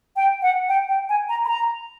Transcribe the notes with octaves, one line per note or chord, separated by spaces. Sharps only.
G5
F#5
G5
G5
G#5
A#5
B5
A#5